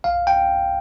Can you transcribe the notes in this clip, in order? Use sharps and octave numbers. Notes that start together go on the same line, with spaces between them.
B1 F5
G5